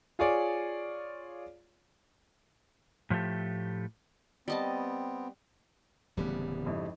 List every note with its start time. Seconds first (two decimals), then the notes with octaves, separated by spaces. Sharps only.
0.19 F4 G#4 C#5 D5
3.10 A2 F3 A3 G4 A4
4.48 G3 B3 C4 D#5 A5
6.17 D1 C#3 E3 G3 A3 B3
6.66 G#1 F2 E4